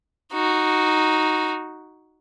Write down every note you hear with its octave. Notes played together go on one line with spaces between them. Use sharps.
D#4 F#4